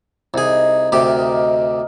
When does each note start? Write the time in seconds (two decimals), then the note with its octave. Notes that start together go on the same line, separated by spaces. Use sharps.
0.34 C2 D#4 G#4
0.92 D2 C3 G4 A#4
1.19 A#4 D#5